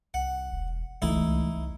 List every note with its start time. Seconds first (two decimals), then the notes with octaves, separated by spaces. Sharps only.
0.14 C2 F#5
0.52 E1
1.02 F#1 C#2 E3 A3 D#4 E4
1.22 C2